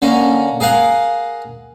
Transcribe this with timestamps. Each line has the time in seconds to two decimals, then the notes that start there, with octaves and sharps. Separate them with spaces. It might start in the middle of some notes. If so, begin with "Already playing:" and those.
0.02 D3 A#3 C#4
0.60 G#4 A#4 F5 F#5 G#5